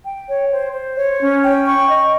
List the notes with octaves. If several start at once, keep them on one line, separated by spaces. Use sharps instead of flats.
G5
C#5
C5
C5
C#5
C#4
G5
C#6
D#5